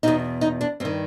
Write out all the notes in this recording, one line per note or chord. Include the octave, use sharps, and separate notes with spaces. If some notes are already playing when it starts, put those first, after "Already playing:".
E2 B2 D#4
D#4
D4
G2 D#3 C4